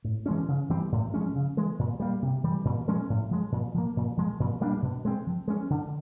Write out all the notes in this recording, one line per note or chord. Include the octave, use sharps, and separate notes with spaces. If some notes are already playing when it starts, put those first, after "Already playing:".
A2
E3 G#3 C#4
C#3
E3 G3 C4
A2
F3 G#3 C#4
C#3
E3 G#3
A#2
G3 A#3
C3
E3 G3
A#2
F3 G#3 C#4
A2
F3 G#3
A#2
F3 A#3
A#2
F3 G#3
A#2
G3 A#3 D4
B2
G#3 C4
F3
G#3 C#4
D3